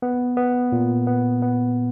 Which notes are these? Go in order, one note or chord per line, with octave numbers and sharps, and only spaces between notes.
B3
B3
A#2
B3
B3